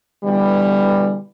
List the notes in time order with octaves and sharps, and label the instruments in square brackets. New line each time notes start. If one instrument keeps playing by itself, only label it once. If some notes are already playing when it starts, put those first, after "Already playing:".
[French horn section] B2 D3 E3 G3